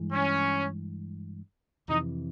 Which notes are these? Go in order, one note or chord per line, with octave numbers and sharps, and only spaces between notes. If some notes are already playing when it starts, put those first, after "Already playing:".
Already playing: G2 E3 G#3
C#4
F2 C3 E3 D#4